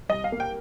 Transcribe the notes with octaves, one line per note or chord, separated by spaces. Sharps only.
C2 D#5
F5
A#3
G5